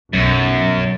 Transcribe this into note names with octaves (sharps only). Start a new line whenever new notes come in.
B1 F#2